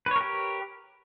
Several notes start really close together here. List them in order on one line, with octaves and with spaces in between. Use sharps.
B4 C#5 A#4 G4